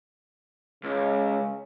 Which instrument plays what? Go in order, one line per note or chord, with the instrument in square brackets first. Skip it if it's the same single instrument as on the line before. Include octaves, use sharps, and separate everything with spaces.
[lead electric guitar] C#2 [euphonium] C#3